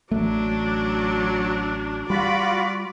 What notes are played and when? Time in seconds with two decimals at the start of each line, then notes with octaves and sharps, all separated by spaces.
0.12 A1 F#3 A3 D4
2.10 G3 F4 F#4 D5 B5